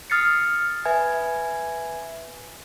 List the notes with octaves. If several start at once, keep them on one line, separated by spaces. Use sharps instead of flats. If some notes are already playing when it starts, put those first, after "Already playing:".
D#6 F6 A6 C7 C#7
B4 E5 G#5 G#6